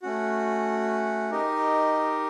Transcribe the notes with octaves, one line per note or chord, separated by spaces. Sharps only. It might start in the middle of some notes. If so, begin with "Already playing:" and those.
A3 C#4 F#4
D#4 G4 A#4 D#5